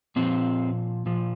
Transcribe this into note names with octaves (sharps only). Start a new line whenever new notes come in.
A#2 F3 C4
A#2 F3